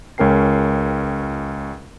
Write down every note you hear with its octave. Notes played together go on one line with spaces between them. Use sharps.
C#2 C#4 A#4 G5 C7